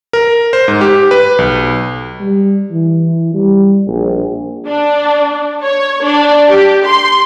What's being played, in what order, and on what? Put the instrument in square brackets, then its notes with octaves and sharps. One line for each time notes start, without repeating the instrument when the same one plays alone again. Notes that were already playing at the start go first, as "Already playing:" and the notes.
[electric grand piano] A#4
C5
G#2
G4
B4
B1
[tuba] G3
E3
G3
A#1
[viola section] D4
C#5
D4
G4
C6